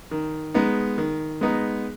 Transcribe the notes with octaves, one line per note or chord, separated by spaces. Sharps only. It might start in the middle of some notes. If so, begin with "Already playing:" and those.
D#3
G#3 B3 D#4
D#3
G#3 B3 D#4